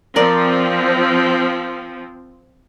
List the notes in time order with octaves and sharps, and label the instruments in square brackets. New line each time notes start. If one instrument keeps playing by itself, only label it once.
[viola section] F3 C4 [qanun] A#4 D5